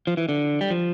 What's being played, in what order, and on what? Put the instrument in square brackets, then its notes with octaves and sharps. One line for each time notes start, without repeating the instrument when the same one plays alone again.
[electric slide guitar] F3
E3
D3
G3
F3